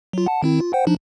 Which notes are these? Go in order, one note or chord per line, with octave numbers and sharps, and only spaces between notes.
F#3 F4
F#5 A5
D#3 C4 E4
F4
C5 F#5 G5
F3 D4 D#4